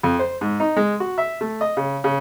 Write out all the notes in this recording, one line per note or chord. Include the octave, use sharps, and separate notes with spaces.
F2
C5
G#2
D#4
G#3
F#4
E5
A3
D#5
C#3
C#3